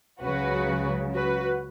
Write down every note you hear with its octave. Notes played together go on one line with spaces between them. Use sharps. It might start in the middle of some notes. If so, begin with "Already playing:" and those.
C#2 C#3 F#3 F#4 B4
F#4 B4